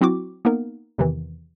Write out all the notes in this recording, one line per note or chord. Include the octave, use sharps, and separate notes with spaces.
F#3 C4 E4 F#4 D6
A#3 B3 D#4 A#4
E2 C3 D#3 E3